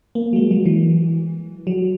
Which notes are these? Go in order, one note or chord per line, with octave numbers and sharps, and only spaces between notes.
A#3
F#3
G#3
F#3
E3
F#3